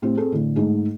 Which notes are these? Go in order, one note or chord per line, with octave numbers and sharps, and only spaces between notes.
A2 C4 G4
C4 G#4 A4
A2 D3
G#2 A3 D#4 G#4